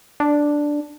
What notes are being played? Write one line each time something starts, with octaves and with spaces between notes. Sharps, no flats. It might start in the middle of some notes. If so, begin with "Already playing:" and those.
D4